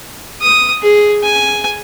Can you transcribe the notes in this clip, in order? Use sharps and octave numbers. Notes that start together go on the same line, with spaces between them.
D#6
G#4
G#5